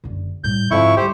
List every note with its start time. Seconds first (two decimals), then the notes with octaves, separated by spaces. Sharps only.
0.04 F#1 D3
0.44 A2 G3 G6
0.71 F2 G#2 D3 E4 C#6
0.97 G3 G4 C5